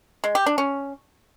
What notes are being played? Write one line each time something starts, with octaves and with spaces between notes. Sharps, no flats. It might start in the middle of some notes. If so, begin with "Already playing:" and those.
G#3
G4
D4
C#4